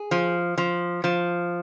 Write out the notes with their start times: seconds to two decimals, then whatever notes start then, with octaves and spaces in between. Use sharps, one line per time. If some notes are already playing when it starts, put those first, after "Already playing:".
Already playing: G#4
0.11 F3
0.58 F3
1.04 F3